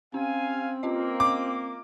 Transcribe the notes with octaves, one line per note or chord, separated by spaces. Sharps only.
C4 C#4 F5 G#5
A#3 C#4 F4 D#5
D6